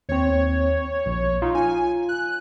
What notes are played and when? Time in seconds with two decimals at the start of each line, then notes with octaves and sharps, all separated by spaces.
0.09 D#2 C4 C#5
1.06 A#1
1.42 D#4 F4
1.55 G#5
2.09 F#6